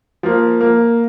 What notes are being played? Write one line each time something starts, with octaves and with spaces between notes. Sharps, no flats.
F3 A#3
A#3